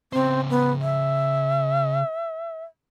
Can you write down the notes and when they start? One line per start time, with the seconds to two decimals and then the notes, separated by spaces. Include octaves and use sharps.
0.13 C#3 C4 C5
0.50 B3
0.81 E5